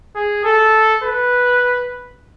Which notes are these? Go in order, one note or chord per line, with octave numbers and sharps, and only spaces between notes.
G#4
A4
B4